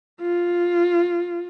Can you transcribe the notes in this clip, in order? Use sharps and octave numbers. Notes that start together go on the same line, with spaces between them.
F4